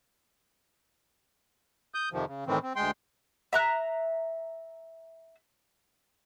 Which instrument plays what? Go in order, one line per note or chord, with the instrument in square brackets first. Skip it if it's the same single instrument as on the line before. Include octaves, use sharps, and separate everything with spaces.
[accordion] D#6 G6
F2 C3 D#3 F3
C#3
A2 D#3 E3 C4
C4
D2 G#3 G5 C6
[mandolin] E5 A#5 F#6